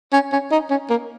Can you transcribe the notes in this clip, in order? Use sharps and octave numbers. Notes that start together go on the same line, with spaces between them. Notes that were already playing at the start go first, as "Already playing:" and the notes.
C#4
C#4
D#4
C#4
A#3